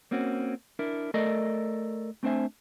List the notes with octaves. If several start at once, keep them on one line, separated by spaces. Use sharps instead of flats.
A#3 C4 C#4 F#4
D4 E4 A#4
A3 A4 A#4 D5 D#5
A3 C4 D4 C5 E5 G#5